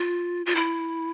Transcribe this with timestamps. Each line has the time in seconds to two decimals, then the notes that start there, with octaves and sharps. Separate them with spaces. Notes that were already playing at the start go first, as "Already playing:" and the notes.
Already playing: F4
0.46 F4
0.55 E4